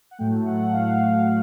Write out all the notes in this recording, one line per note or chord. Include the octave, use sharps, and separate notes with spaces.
F#5
A2 F#3 A3 G5
F#5
F5